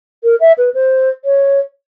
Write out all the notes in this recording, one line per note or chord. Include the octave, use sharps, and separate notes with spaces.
A#4
E5
B4
C5
C#5